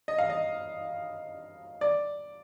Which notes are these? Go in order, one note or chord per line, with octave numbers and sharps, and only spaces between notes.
D#5
F5
D#5
D5